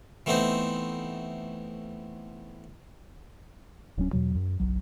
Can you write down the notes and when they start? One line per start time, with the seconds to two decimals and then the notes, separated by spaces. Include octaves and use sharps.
0.26 E3 A3 B3 C4 D#4 C5
3.98 D1 F#3 C#4
4.13 E2 B2 F#3
4.35 F#2
4.60 F#1 B1 F#3